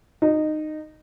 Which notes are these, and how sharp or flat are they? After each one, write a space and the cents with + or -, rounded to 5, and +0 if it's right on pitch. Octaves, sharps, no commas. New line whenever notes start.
D#4 -15